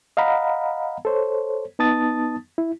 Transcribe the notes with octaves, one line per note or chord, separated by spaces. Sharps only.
D#5 F5 F#5 A#5 B5
A4 C5 C#5
B3 D#4 A5 D#6 A6
E4